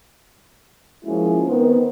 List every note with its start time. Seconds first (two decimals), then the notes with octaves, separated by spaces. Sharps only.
1.04 F3 G#3 A#3 C#4 E4 F#4
1.47 D#3 B3 C4